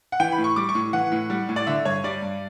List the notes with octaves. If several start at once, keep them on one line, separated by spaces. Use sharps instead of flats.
F#5
E3 G5
B5
A2
C#6
G3 D6
C#6
A2
E3 F#5
A2
G3
A2
D5
D3 E5
G2 C#5
G3 D5
G2